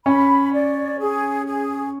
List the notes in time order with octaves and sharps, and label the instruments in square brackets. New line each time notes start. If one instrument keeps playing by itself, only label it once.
[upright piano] C#4 [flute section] B5
[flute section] D5
G#4
G#4